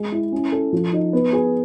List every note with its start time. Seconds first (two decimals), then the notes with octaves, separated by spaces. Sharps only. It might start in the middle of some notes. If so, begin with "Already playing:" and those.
Already playing: G#3 G#4
0.12 E4
0.32 C#4
0.52 A4
0.73 F3
0.93 D#4
1.13 B3
1.33 G#4